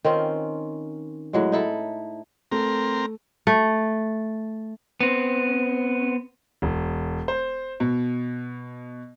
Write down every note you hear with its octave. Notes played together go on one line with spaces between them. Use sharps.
D#3 C4 C#4 F4
A2 F#3 G#3
D#4 E4 A4
A3 C4 A#4
A3
B3 C4
E1
C5
B2